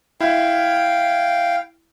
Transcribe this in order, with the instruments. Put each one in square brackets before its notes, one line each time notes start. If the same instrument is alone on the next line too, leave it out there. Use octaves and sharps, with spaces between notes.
[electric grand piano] E4 [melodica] F5 G5